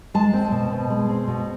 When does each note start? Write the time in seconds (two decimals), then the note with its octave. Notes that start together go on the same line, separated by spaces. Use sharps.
0.14 G#3 A5
0.33 C4
0.52 B2
0.71 B2
0.90 G#3
1.09 C4
1.28 B2